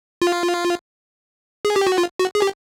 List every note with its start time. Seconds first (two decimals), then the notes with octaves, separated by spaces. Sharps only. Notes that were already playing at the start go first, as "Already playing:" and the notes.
0.22 F4
1.65 G#4
1.76 G4
1.87 F#4
1.98 F4
2.19 F#4
2.35 G#4
2.42 G4